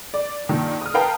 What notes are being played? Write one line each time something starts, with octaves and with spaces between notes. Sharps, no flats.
D5
G2 A#2 D#3
D#6 F6
A#4 B4 F5 G5 A5 A#5